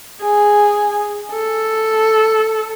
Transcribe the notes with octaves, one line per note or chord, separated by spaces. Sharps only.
G#4
A4